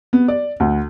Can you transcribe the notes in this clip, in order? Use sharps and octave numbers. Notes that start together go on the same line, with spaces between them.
B3
D5
D2